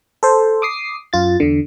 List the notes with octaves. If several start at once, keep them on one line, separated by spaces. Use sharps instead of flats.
A4 C5
D6 D#6 C7
F#2 F4 A6
E2 D3